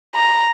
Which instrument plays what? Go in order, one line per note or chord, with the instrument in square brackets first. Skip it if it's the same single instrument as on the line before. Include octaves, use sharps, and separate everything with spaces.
[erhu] A#5